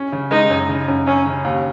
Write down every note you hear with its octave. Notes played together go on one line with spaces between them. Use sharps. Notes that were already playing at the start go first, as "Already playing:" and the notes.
Already playing: C#4
C#3
G#3 D#4
F#2
C#3
F#2
F#2 C#4
C#3
D#2